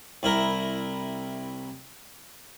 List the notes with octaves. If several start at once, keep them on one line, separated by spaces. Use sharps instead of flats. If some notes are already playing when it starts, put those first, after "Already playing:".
C2 E4 A#4